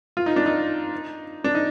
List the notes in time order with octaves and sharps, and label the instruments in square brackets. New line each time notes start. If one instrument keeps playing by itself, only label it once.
[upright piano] F4
D#4
D4
D#4
D4
D#4